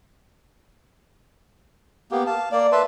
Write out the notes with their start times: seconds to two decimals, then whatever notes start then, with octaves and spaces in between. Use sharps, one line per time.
2.11 A#3 B3 G4
2.27 F5 A5
2.52 A#3 D5
2.72 B4 E5 A5 C6